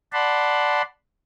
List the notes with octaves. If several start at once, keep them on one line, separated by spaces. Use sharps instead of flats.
D5 F#5 A5 B5 C6